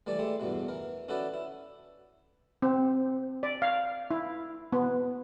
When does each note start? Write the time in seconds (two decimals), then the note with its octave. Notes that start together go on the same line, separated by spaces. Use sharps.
0.07 E3 G3 A3 D5
0.19 G#3 A3 E4 G4
0.40 E2 G2 B2 E3
0.68 E3 A#4
1.08 C#4 E4 F#4 A4 B4 D5
1.34 E4
2.62 C4
3.43 D5
3.62 F5
4.11 E4
4.72 B3